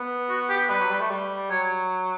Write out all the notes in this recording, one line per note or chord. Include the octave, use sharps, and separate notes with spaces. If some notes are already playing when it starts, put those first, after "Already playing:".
Already playing: B3
F#4
G4
G3 B4
F#3
G3
A3
G3
F#3 C#5